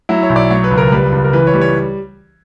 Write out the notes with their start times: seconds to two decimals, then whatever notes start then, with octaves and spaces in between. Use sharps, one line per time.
0.09 F#3 E4
0.23 C#5
0.30 B1
0.36 D5
0.50 F#3 C#5
0.64 B4
0.71 C#2
0.78 A#4
0.92 G3 B4
1.12 C#2
1.24 A#4
1.33 E3 B4
1.47 C#5
1.54 G3
1.61 C#5